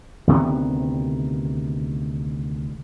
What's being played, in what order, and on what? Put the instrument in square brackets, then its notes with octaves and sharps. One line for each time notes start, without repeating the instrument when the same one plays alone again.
[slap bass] D2 C3 D#3 B3